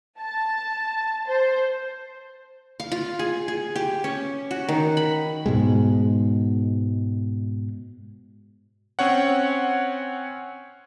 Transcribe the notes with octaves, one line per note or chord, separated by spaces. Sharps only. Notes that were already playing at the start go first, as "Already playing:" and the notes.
A5
C5
F5
F4
G#4
G#4
G4
C#4
F#4
D#3
B5
G#2 B2 G#3
C4 C#4 C#5 F#5